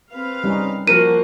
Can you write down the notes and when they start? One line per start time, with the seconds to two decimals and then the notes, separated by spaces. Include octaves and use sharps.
0.12 C4 B4 F5
0.44 G3 C#4 D#4
0.88 F3 A#3 F#4 A#4 D#7